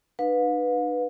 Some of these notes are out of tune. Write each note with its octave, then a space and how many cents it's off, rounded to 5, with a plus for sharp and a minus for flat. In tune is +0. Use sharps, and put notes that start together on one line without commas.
D4 +45 B4 +0 F5 +40